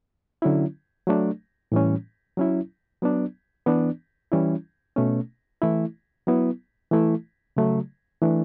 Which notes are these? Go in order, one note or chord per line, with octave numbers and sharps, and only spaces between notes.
D3 F#3 C#4 E4
F#3 A3 D4
A2 E3 G3 C#4
F#3 C#4 E4
F#3 B3 D4
E3 B3 D4
E3 G3 C#4 E4
B2 A3 C#4
E3 A3 E4
F#3 B3 E4
E3 A3 E4
C#3 F#3 A3
E3 A3 D4